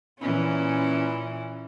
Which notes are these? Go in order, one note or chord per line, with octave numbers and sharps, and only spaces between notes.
A#2 E3 C#4